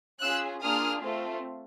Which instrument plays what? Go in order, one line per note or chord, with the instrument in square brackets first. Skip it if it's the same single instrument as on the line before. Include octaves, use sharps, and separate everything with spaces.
[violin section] C#4 F4 G#4 E6 F#6
A#3 D4 F4 G#4 D#6 F6
A3 C4 F4